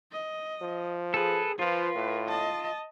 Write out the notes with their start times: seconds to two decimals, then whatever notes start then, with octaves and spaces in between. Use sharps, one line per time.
0.12 D#5
0.62 F3
1.14 G#4 A4 B4
1.59 F3 F4 B4
1.95 A2
2.28 D#5 A5